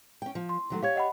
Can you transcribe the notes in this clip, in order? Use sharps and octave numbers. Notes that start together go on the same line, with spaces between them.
C#4 G5
F3
C6
D#3 F#3 A3
G4 C#5 F5 G#6
D#5 F#5 B5